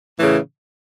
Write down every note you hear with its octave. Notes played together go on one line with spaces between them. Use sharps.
A2 C#3 E3